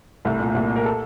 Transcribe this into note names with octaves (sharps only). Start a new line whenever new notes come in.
C2 A3
A#2
A3
C2 A#3
A#2
A#4
A4